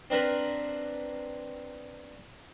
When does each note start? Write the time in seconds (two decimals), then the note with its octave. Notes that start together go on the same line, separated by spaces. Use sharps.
0.10 C4 D4 A#4 B4